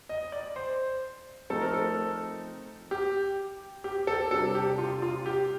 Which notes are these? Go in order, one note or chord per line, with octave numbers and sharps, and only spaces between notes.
D#5
D5
C5
F3 A3 C4 D#4 A4
A#4
A4
G4
G4
A4
C3 G3 D4 A4
G4
F4
F4
G4